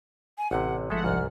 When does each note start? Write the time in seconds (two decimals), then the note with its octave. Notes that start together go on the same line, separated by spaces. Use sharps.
0.38 G#5
0.51 A1 C3 F#5
0.90 G1 F3 G#3 A3 A4 E5 F#5
1.04 C2 G#2 F6